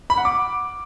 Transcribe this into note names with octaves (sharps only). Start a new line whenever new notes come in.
B5
F#5
D6